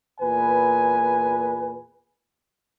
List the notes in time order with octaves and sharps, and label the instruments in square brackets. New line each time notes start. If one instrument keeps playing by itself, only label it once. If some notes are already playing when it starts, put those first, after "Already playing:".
[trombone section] E2 A#2 B4 [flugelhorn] G#5